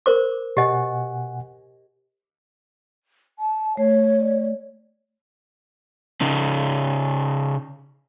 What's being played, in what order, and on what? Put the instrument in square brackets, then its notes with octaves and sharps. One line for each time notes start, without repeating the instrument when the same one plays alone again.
[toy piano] A#4 C5 D6
[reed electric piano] B2 F#5 G#5 [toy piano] G4 D#5
[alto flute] A5
[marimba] A3 [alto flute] C#5
[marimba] D5
[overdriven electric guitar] C#3 D#4